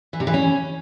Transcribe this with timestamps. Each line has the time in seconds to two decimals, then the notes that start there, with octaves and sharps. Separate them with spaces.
0.13 E3
0.20 C3
0.27 E3
0.34 C#4